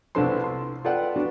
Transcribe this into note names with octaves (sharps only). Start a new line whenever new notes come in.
C2 B3 D4 A4 C5 C6
C6
F4 A4 B4 D5 F#5 G5
B3 D4 F#4